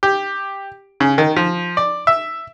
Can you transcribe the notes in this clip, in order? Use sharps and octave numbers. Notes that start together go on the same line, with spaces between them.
G4
C#3
D#3
F3
D5
E5